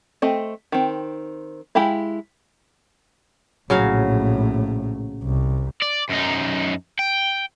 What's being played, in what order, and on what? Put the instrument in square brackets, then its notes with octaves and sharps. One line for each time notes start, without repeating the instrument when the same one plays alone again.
[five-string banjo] A3 C4 D#5
D#3 C4
G#3 E4 G4 F5 B5
[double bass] A#1 A2 [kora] C#3 F#3 F5
[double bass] C2
[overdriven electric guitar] D5
F#2 D#4
G5